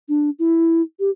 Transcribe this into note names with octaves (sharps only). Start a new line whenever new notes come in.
D4
E4
G4